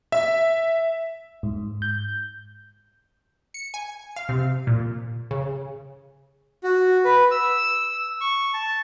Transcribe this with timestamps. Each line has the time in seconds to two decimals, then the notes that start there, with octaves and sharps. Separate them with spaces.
0.12 E5
1.43 G#2
1.82 G6
3.54 C#7
3.74 G#5
4.16 F5
4.29 C3
4.67 A#2
5.31 C#3
6.63 F#4
7.05 B4
7.31 E6
8.21 C#6
8.54 A5